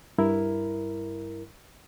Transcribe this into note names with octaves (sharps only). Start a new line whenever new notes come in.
G2 E4 A#4